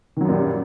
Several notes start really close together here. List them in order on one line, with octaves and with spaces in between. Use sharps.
D#3 F#3 F#2 A#2 G3